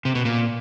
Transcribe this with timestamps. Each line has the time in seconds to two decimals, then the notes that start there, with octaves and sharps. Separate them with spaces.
0.05 C3
0.15 B2
0.25 A#2